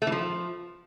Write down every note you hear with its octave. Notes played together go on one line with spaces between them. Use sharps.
A3
E3
F3